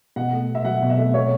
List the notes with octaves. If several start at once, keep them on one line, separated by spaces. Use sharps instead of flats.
B2 F#5
A3
B2
E5
F#3 F#5
B2
E5
A3
B2 C#5